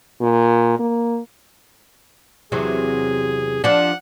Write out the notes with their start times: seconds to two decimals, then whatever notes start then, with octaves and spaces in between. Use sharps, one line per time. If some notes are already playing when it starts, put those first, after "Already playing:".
0.21 A#2
0.79 A#3
2.52 E2 C3 F#3 G#4
3.64 F3 D4 F#5